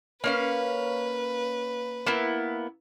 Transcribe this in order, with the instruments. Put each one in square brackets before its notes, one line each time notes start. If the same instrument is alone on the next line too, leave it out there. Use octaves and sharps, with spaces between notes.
[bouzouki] A#3 C#4 F5 [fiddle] B4
[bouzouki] A#3 B3 E4